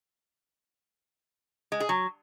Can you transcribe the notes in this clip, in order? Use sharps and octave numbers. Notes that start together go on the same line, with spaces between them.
G#3
G#4
F#3